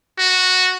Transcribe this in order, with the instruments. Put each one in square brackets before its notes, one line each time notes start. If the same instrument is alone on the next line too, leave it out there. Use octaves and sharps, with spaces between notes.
[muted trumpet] F#4